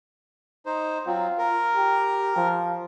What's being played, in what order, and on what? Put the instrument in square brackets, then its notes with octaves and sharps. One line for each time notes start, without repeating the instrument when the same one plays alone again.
[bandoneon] D#4 C5
[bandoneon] F#3 C4 [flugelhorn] F4
[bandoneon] A#4
[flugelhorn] G4
F3